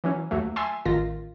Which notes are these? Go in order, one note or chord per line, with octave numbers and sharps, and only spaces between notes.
E3 F#3 C#4
D#2 F#3 A3
E5 G#5 A5 C6
A1 D#3 F4 A#6